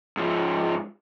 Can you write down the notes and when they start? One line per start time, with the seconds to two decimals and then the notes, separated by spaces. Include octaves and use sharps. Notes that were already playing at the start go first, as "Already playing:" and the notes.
0.17 G#2 F3